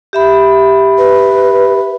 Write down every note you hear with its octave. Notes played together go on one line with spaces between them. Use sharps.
G4 E5 B5
B4